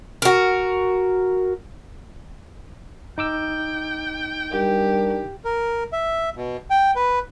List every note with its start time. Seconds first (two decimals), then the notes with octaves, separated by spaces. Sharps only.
0.22 F#4 A#4
3.18 D#4 G5 D6 E6
4.52 G3 D4 G4 A#4
5.45 A#4
5.93 E5
6.36 B2
6.70 G5
6.96 B4